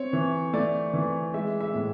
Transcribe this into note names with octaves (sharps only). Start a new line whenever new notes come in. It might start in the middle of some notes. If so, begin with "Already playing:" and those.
Already playing: C4 C#5
E3
A3 D5
E3
G#3 E5
E5
A2